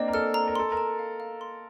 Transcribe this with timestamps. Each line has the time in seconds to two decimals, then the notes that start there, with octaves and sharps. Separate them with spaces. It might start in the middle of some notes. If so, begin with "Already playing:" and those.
Already playing: A#3 C4 D4 D#5
0.08 A#4
0.14 A4 F6
0.34 A#5
0.48 A#4
0.55 A4 C6
0.72 A#4
0.77 A5
0.99 F5
1.20 F5
1.41 C6